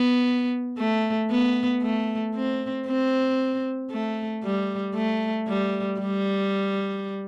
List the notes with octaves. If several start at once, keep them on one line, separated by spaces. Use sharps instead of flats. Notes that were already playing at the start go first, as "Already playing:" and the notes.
Already playing: B3
A3
B3
A3
C4
C4
A3
G3
A3
G3
G3